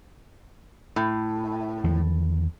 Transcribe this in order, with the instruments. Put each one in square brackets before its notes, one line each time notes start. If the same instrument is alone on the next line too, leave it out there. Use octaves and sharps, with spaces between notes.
[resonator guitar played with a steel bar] A2
[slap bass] E2 D#3 F3